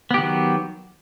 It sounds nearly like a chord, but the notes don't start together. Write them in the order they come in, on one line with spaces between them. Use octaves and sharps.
B3 G4 D#3 F#3